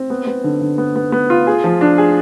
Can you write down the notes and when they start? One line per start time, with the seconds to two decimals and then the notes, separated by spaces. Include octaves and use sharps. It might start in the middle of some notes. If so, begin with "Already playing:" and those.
Already playing: C4
0.10 B3
0.27 B3
0.44 D3
0.61 D3
0.78 B3
0.96 B3
1.12 B3
1.30 F4
1.47 G#4
1.64 F3
1.81 D4
1.98 G#4